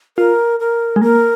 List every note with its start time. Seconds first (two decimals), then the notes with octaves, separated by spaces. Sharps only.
0.18 F4 A#4
0.60 A#4
0.96 G#3
1.02 A#3 A#4